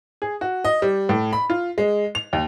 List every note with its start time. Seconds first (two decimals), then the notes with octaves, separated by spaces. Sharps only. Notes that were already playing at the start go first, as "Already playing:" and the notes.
0.22 G#4
0.41 F#4
0.65 D#5
0.82 G3
1.09 A2
1.33 B5
1.50 F4
1.78 G#3
2.15 F7
2.33 D#2